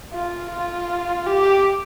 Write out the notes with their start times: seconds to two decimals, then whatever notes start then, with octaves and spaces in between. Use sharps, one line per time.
0.13 F4
0.51 F4
1.26 G4